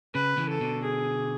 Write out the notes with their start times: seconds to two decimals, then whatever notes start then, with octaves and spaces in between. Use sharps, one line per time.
0.15 C#3 B4
0.37 C#3 E3
0.49 A4
0.61 B2 D3
0.84 G#4